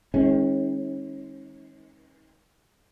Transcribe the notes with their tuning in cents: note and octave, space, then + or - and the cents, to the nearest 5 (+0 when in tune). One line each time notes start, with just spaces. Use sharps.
D#3 +35 G#3 +0 C#4 -30